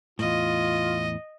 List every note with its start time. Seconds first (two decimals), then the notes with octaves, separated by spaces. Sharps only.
0.19 E2 A2 F4 D#5